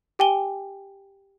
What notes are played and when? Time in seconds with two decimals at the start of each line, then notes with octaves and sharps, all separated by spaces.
0.19 G4 G5 G#5 G7